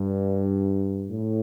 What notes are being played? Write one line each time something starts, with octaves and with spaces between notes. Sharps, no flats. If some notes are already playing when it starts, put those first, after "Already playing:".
Already playing: G2
A2